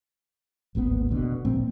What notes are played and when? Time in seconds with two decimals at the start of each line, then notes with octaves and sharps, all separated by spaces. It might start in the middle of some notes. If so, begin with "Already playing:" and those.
0.75 D1 G#1 A#3 B3
1.11 F1 B2 D3
1.45 A#2 F3 A#3 C4